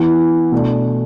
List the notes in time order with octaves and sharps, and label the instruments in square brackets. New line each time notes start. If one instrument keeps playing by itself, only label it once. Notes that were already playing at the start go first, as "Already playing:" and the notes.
Already playing: [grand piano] E3 B3 E4
B2 A3 D4